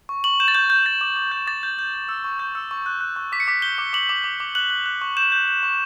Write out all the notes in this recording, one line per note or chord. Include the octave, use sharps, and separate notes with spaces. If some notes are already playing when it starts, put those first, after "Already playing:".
C#6
C#6 F#7
G6 E7
A6
C#6 G6
G6
G6 A6
D6
D6
G6
D6 A6
G6
G6
G6
E6
C#6
G6
E6
C#6
F#6
F#6
C#6
D6 B6
C#7
D6 B6
G6 G7
D6
D6 F#7
D6
D6
D6
F#6 F#7
F#6
F#6
C#6
G6 E7
G6
G6
C#6